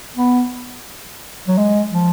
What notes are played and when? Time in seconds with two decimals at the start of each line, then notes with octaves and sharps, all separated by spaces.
0.17 B3
1.48 F#3
1.58 G#3
1.92 F3